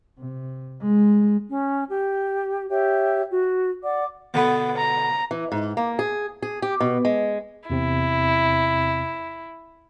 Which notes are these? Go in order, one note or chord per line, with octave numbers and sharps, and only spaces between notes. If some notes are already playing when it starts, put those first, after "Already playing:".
C3
G#3
C#4
G4
G4 C#5 E5
F#4
D5 F#5 D6
B2 D3 B3 B4
A#5
E3
G#2
A#3
G#4
G#4
G4
B2
G#3
E2 C3 C4 E4